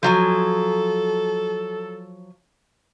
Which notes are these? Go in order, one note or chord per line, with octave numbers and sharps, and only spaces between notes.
F3 F#3 A4 G#5